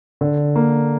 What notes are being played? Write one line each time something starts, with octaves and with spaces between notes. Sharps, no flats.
D3
A#3